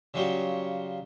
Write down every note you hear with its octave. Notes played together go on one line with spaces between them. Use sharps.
C#3 F#3 G3 F4 F#4